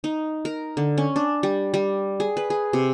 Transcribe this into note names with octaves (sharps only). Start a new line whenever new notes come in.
D#4
A#4
D3
C#4
D4
G3
G3
G#4
B4
G#4
C3